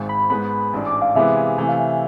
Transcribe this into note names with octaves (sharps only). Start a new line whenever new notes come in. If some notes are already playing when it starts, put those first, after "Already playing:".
Already playing: G#1 G#2 G#3
B5
G#2 G#3 B3 B5
A1 G#2 G#3 D4
D6
F5
C3 E3 G#3 B3 E5
G#5
C3 E3 A3 G#5
F5
E5